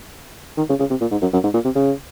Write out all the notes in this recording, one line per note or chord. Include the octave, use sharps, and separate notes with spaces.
D#3
C#3
C#3
C3
A#2
G#2
F#2
F#2
G#2
A#2
C3
C#3